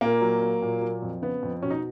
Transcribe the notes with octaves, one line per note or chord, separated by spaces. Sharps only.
A#2 A#3
F#3
F#3
A#2
F#3
F2
C#3 B3
F2
B2 C#4
D#4